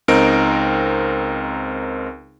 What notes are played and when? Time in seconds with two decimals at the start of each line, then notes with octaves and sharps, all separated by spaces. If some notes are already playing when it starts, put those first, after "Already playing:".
0.08 C#2 C4 D#4 A#4 D7